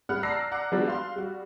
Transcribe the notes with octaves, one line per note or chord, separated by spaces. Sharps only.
A2 G3 F#5 B5 F6 F#6
D5 A5 A#5 E6 A#6 C7
D5 F#5 A#5 D6 F#6
F3 G3 G#3 B3 D4 F#4
F5 C6
G3 F#4